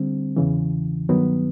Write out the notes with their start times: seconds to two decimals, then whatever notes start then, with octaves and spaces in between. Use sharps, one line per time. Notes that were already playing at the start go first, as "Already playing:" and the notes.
Already playing: D3 G3 C4
0.36 E2 C#3 E3
1.09 G2 D#3 F#3 B3